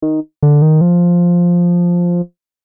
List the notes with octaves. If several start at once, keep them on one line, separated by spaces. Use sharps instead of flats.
D#3
D3
D#3
F3